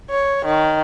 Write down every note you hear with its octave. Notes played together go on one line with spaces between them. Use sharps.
C#5
D#3